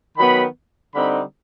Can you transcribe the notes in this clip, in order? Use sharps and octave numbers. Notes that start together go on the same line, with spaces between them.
D#3 F#3 B3 B5
D3 G3 C4 D#4 B5